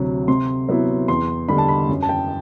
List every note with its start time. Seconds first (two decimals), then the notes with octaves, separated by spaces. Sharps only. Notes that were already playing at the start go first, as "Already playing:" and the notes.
Already playing: D2 C3 F#3
0.28 C3 C6
0.69 F#3 B3 E4
1.08 E2 C6
1.48 D3 G3 D4 B5
1.58 A5
1.68 B5
1.89 F#2
2.02 A5
2.09 G5